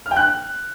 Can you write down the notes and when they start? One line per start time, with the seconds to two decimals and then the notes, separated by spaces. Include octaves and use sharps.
0.06 F6
0.11 G5
0.16 F#6